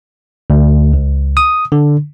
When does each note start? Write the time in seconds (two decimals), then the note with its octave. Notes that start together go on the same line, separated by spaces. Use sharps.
0.50 D2
0.93 C#2
1.37 D#6
1.72 D3